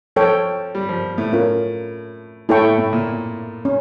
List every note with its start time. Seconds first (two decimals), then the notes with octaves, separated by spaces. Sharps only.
0.16 F3 A4 C#5 G5
0.75 G3
0.89 F3
1.18 A2
1.33 C#4 F4 A#4
2.49 A2 E4 A4 C#5 G5 C#6
2.64 A2
2.78 A2
2.93 A#2
3.65 C#4